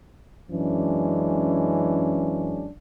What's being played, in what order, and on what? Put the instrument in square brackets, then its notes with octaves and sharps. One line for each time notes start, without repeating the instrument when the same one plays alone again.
[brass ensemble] F#2 E3 G#3 C#4 D4